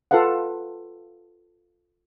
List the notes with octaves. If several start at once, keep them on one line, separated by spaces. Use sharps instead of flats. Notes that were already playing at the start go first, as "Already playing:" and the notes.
F4 A4 B4 F5 F#5